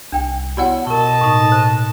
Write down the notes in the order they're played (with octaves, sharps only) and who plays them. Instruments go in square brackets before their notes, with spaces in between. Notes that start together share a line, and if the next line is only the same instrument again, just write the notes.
[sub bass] C2 [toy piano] D4 G5
[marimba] B3 E4 C#5 [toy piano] F#4 D5 F#5
[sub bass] B2 [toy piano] A#4 C#6 [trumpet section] D#5 A5
[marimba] A2 D#4
[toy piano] C5